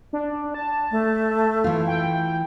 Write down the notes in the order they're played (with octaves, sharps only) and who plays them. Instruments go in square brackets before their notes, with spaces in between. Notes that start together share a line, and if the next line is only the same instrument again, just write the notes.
[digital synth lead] D4
A5
[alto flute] A3
[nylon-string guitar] E3 F4
[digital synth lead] G5